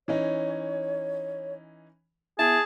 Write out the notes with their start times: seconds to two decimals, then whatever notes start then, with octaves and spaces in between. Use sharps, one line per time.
0.08 E3 C#4 D#4 C#5
2.39 B3 E4 G#4 A5